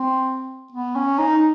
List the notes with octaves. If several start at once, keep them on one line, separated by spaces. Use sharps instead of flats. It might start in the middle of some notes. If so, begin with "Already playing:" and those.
Already playing: C4
B3
C#4
D#4